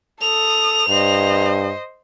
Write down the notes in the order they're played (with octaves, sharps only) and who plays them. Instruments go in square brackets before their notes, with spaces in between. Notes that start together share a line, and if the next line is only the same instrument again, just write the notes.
[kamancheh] A4 D#6 [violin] F7
[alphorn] G2 [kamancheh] C5 D#5